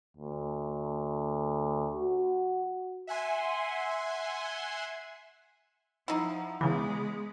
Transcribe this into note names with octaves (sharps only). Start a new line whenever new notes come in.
D2
F#4
E5 F#5 G#5 C6
F3 D#4 E4 F#5 A#5
C#3 E3 G#3 B3 D6